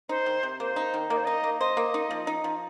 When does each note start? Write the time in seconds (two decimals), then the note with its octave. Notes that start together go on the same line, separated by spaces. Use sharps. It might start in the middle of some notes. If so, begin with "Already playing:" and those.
0.09 D#4 C5
0.26 D#3
0.43 C3
0.60 A#3 C5
0.76 D#4
0.94 D#3
1.10 A#3 D#5
1.17 C5
1.25 D#4 D#5
1.44 A#3
1.60 C5 D#5
1.77 A#3
1.94 D#4
2.10 F3
2.27 D#4
2.44 F3